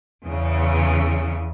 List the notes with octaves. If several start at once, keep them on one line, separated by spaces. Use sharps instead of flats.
E2 C#3